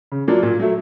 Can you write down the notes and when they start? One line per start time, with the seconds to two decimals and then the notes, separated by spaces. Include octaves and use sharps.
0.12 C#3
0.28 F#3 A#3 D4 F4
0.43 A#2
0.59 F#3 A3